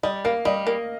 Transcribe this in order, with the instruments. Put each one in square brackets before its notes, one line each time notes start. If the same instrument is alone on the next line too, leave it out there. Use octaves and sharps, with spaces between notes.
[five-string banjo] G3 [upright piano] D#5
[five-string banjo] A#3 [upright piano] F5
[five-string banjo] G3 [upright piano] D#5
[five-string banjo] A#3